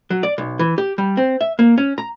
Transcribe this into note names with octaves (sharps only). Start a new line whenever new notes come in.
F#3
D5
B1
E3
G4
G3
C4
E5
A#3
C#4
A#5